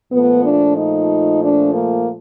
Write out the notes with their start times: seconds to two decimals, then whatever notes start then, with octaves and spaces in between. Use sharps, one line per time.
0.12 A#2 F3 A3 B3
0.44 D4
0.77 D#4
1.42 D4
1.75 A#3